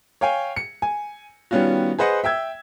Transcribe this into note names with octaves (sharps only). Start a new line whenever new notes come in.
C#5 F5 G5 G#5
C#7
G#5
D#3 G3 B3 C#4 F4 F#4
G#4 B4 C5 D#5 F#5
E5 G5 E6 G#6